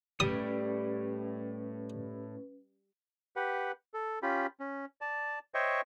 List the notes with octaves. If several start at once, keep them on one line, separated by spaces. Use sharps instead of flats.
A2 G3 C#4 B4 D#6
G4 B4 F#5
A4
C#4 F4 G4 B5
C#4
D5 A5
C5 C#5 D#5 E5 G5 C#6